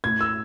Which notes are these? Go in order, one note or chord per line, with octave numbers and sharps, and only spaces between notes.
A2 G#6
E6